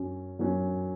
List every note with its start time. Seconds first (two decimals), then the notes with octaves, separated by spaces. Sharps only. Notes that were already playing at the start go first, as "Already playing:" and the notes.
Already playing: F#2 F#3 C#4
0.39 F#2 F#3 C#4